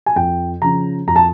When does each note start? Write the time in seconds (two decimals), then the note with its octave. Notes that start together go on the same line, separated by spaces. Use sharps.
0.06 G#5
0.16 F2 G5
0.62 C#3 F3 A#5
1.07 F2 A#5
1.16 A5